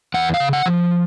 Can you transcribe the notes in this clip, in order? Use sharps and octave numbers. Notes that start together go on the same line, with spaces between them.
E2 F#5
F5
C#3
F#5
F3